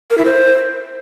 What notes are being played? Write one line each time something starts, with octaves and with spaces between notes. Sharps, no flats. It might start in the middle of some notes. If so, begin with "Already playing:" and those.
A#4
E4
C5